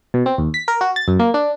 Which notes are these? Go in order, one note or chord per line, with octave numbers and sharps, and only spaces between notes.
B2
C4
D#2
B6
A#4
F#4
A6
F#2
A#3
D4